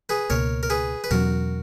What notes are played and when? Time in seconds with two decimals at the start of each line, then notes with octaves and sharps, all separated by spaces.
0.09 G#4 B4
0.29 C#2 B2 A#3 A#4 C#5
0.63 A#4
0.70 G#4 B4
1.04 B4
1.11 E2 B2 F#3 C#4 F#4 A#4